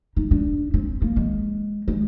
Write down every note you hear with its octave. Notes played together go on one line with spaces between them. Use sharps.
D#4
D4
C4
A#3
G#3
G#3